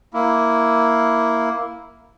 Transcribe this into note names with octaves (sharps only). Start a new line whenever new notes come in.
A#3 E4